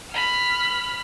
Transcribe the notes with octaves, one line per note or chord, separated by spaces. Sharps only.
B5 F6